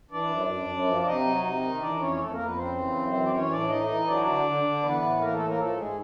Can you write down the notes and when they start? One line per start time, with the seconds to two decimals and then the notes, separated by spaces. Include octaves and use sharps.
0.11 E3 D4 D5
0.30 F#2
0.49 F#2
0.68 F#2
0.87 F3
1.02 D5
1.05 C3 D#4 D#5
1.24 F#3
1.43 C3
1.62 D#3
1.81 E3 D4 D5
2.00 F2 C#4 C#5
2.19 F2 A3 A4
2.31 A#3 A#4
2.38 F2
2.44 B3 B4
2.56 C#3 C4 C5
2.75 E3
2.94 F#2
3.13 E3
3.25 D5
3.32 E3 C#4 C#5
3.51 A2 D4 D5
3.69 E3 D#4 D#5
3.88 E3
4.07 F#3 D4 D5
4.26 D3
4.45 D3
4.63 D3
4.83 E3 B3 B4
5.02 A2
5.20 E3 A#3 A#4
5.33 A3 A4
5.39 A2
5.46 A#3 A#4
5.58 F3 A3 A4
5.77 G#2 G#3 G#4